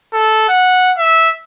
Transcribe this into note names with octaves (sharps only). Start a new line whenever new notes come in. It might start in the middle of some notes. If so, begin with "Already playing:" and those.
A4
F#5
E5